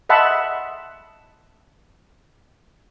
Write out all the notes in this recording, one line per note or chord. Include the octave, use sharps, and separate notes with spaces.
D#5 E5 F#5 A5 B5 C6